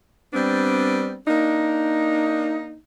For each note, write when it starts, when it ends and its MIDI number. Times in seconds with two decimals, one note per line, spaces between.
0.33 1.15 55
0.33 1.15 59
0.33 1.15 60
0.33 1.15 62
1.27 2.76 58
1.27 2.76 62
1.27 2.76 63